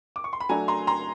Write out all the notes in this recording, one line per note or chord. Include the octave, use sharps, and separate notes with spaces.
D6
C#6
C6
B5
F#3 A3 D4 G#5 A#5
A#5 C6
A#5 C6